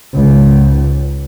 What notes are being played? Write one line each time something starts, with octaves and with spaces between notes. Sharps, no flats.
C#2 G#2